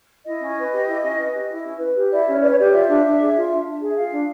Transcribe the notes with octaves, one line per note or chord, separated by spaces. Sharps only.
E4 D#5
C#4
B4
G4
E4
C#4
B4
G4
E4
C#4
B4
G4
E4 D5
C#4
B4 D5
C#5
G4 D5
F4 E5
D4
D4
G#4
F4
D4
D4
G#4
E5
F4 F5
D4